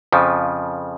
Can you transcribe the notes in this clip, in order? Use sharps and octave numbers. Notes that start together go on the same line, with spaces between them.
F2 C#3 F3